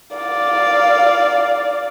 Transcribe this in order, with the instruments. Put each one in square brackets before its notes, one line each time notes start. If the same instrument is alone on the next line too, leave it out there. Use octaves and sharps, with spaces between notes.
[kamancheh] D5 F5